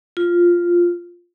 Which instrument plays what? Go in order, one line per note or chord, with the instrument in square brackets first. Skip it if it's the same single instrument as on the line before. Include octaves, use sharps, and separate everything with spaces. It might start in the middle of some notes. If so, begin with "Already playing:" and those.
[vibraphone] F4